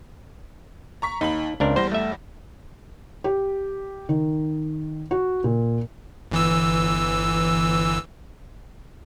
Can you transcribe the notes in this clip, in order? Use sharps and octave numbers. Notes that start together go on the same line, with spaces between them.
A#5 C#6 B6
D#2 D#4 B5 F#7
C#2 C4 D4 A#4
E2 G3 C5 A#6
A3 E5
G4
D#3
F#4
A#2
G1 E3 E6